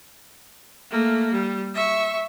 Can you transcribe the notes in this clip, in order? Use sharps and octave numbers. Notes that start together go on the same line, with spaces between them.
A3 A#3
G3
E5 C#6